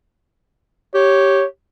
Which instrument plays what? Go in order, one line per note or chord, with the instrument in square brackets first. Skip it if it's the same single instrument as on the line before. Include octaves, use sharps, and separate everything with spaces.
[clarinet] G4 [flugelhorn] C#5